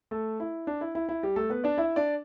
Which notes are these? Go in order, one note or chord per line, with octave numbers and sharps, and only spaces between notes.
A3 A4
E4
D4
E4
E4
E4
G3 G4
A3 A4
B3 B4
D4 D5
E4 E5
D4 D5